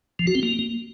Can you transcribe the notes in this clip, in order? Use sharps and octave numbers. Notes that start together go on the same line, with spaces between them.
F3
F#4
C4
A#3